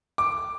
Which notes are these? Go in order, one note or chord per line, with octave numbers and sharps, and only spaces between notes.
D6